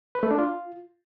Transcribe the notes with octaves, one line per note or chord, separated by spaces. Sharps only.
B4
A3
D4
F4